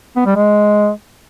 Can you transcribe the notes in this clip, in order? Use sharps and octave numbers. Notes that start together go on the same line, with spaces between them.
B3
G3
G#3